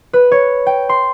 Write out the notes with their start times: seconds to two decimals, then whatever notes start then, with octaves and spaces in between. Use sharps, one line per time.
0.13 B4
0.32 C#5
0.66 G5
0.89 C6